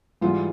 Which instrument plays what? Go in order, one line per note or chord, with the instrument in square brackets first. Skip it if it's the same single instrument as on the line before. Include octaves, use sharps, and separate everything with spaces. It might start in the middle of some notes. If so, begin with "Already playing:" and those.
[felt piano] G#2 E3 G3 F4